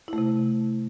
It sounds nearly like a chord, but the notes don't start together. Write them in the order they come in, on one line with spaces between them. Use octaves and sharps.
E4 A3 C3